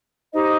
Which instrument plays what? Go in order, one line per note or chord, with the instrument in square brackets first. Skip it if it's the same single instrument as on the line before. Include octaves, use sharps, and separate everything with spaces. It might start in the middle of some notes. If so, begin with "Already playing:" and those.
[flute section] D#4 G4 C5 D#5